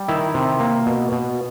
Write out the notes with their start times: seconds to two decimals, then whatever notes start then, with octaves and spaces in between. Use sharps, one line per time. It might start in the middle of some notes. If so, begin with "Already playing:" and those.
Already playing: G3
0.08 D#3 E4
0.34 C3
0.60 A#3
0.86 B2
1.12 B2